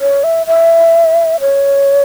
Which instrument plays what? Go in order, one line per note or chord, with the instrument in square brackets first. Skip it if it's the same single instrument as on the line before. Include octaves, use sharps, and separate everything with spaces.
[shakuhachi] C#5
E5
E5
C#5